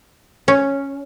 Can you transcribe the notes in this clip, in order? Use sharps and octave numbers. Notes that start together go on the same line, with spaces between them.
C#4